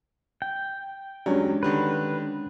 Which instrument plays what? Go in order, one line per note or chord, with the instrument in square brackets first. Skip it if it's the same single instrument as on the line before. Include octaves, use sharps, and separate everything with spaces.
[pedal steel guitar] G5
[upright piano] E2 G2 F#3 [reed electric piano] G#3 C#4 D4
[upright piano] D3 D#3 G3 [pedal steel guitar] B4